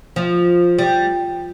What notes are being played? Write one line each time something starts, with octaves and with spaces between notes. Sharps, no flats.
F3
G3